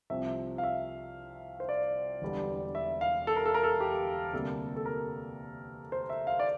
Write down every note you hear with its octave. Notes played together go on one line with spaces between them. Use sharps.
C2 C3 F3 C4 E5
F5
E5
C5
D5
E1 E2 D3 G3
E5
F5
A4
A#4
A4
A#4
A4
G4
D2 C3 G3 A#3 A4
A4
A#4
C5
E5
F5
D5